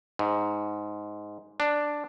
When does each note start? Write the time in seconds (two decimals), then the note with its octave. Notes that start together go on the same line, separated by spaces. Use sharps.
0.19 G#2
1.60 D4